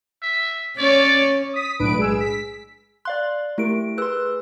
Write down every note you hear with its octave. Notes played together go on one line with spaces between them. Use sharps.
E5
C#4 C#5 D5
D#6 B6
B1 A2 D4 B4 D7
G#3 G#4 E6
B6
D5 F5 C6 F#6
A3 E4 G4 A#4 D7
G#4 B4 C6 E6 F#6